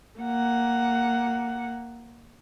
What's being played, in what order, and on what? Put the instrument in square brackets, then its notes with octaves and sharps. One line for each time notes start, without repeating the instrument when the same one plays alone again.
[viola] A#3 F#5